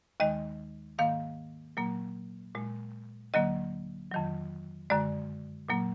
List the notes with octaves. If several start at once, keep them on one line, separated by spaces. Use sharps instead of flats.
D#2 D#3 G#3 D#5
G#2 D#3 A#3 F5
A#2 F#3 A#3
A#2 G#3
D2 D3 F#3 A#3 D#5
F2 D#3 F#3
F#2 D3 G#3 D5
A#2 F#3 A#3